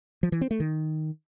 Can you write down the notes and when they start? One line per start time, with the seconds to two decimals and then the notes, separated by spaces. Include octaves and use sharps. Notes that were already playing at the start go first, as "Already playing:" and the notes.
0.23 F3
0.32 E3
0.41 C4
0.51 A3
0.60 D#3